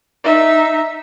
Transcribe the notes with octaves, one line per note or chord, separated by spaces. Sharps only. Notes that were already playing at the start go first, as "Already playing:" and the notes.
D#4 E5